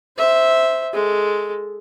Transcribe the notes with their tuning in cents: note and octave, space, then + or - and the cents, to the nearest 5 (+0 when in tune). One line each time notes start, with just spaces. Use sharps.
C5 +0 E5 -10
G#3 +0 A4 +0